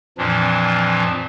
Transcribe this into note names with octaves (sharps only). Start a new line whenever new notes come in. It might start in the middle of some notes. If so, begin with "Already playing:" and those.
F2 A#2 E3 F3 D4